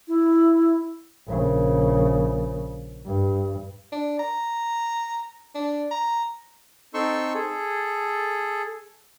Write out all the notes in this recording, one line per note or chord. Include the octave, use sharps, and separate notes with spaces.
E4
A#1 C#3
G2
D4
A#5
D4
A#5
C4 D#4 A4 C6 C#6 E6
G#4 A4